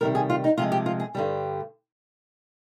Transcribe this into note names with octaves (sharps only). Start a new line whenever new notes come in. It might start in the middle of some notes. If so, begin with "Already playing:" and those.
C3 D#3 G3 A#4
G#4
F4
D#4
C3 F3 G#3 F4
G4
F4
G#4
G2 D3 G3